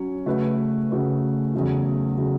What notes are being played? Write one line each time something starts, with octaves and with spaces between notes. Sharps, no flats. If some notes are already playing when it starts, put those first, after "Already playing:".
Already playing: F#3 C#4 C#5
C#3 A3 F#4 B4
C#3 A3 F#4 B4
E2 C#3 F#3 A3 F#4
C#3 F#3 A3 F#4